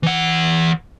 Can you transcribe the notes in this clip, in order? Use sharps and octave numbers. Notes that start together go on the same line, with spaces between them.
E3 F#5